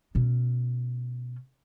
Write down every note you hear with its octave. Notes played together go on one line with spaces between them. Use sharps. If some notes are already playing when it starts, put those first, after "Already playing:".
B2 C#4